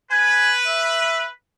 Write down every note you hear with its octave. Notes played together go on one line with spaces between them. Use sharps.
B4 G#5
E5